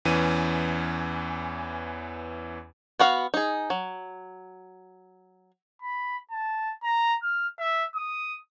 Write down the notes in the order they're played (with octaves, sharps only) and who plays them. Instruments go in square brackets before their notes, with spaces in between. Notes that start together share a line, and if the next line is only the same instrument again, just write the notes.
[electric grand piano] E2 E3 C#4 D#7
[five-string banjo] B3 F#4 F5
D#4 G#4
F#3
[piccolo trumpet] B5
A5
A#5
F6
E5
D#6